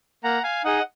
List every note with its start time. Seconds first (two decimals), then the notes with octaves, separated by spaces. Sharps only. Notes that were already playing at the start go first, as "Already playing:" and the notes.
0.24 A#3 F#5 A#5
0.44 F5 G#5
0.64 D#4 G#4 D#5 F#5